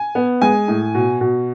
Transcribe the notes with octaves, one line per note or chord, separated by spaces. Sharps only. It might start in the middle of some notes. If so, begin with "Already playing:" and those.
Already playing: G#5
B3
G#3 G#5
A2
B2
B2